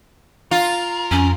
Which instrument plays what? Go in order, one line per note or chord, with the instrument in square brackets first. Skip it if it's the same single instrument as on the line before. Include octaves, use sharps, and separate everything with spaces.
[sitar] F4 [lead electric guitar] A#4
[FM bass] F2 [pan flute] C#4